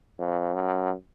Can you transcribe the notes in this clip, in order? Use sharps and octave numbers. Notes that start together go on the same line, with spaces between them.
F2
F#2